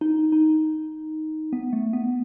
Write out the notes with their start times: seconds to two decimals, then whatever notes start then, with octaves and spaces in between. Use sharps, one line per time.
0.01 D#4
0.32 D#4
1.53 B3
1.73 A3
1.93 B3